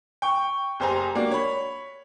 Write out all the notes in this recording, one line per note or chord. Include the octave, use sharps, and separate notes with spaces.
G5 C#6
F#1 G4 C5 G#5 A#5
A#3 D4 F#4 G4
C#5 B5